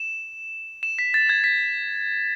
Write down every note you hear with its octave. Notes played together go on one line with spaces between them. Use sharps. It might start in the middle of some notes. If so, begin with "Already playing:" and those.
Already playing: E7
E7
B6
A6
G#6
B6